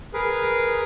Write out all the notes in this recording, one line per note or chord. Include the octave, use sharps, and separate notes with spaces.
G#4 A#4 B4